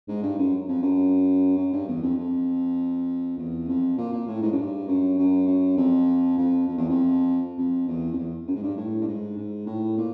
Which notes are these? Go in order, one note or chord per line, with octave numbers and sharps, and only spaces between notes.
G#2
G2
F#2
F2
F#2
F#2
G2
E2
F2
F2
E2
F2
A#2
A#2
A2
G#2
F#2
G2
F#2
F#2
F#2
F2
F2
F2
E2
F2
F2
E2
F2
E2
F#2
G#2
G2
A2
G2
G#2
G#2
A2
A#2